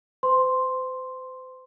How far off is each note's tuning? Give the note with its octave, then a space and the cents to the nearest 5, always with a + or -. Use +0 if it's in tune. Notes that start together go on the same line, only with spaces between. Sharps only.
C5 -35 C6 +0